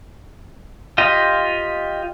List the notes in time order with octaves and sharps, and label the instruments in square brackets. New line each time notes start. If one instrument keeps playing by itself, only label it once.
[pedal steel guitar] F4 G4 D#5